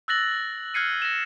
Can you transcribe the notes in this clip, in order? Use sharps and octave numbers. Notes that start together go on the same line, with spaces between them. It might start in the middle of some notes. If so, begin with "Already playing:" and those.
E6 F#6 A6 A#6 F#7
F6 F#6 G#6 C7 C#7 D#7
A#6 E7